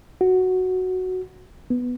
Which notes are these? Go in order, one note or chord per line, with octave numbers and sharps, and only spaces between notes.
F#4
B3